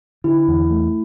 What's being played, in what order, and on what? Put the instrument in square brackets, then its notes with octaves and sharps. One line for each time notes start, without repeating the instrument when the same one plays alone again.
[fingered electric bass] D3 [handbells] E4
[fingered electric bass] E2
A3